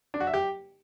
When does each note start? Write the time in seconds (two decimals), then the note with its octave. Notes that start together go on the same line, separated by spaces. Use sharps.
0.14 D4
0.20 F#4
0.27 E5
0.34 G4